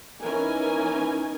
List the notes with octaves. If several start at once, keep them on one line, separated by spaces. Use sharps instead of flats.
E3 B3 C#4 D#4 A#4 G#5